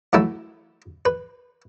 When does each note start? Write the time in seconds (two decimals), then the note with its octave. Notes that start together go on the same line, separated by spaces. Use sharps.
0.13 E3 F#3 A3 E4
1.05 B4